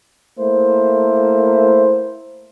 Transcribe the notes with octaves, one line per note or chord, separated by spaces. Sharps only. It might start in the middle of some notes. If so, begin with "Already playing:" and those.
A3 A#3 E4 C5